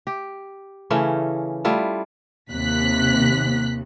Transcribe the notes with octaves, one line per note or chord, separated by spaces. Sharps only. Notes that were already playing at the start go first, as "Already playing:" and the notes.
G4
C#3 E3 A3 C#4
G3 A3 E4 F4
D#2 C3 F#6 B6